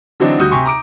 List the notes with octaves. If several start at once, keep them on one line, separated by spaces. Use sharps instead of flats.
D3 E3 F#3 C4 D4 D#4
D2 G3 F#4 D#6 G6
C3 G4 G#5 C6 C#6
A#5 D6 D7